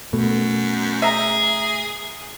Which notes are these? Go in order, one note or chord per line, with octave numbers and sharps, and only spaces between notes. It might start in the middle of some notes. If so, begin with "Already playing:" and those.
F#2 B2 A3
G#4 E5 A#5